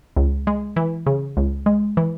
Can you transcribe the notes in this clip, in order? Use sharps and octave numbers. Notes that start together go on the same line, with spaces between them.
C#2
G#3
E3
C#3
C#2
G#3
E3